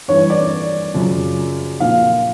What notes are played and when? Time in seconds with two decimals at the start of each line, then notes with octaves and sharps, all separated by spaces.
0.08 G2 E3 C#5
0.30 D5
0.94 F#2 C#3 F3
1.80 A#2 F3 F5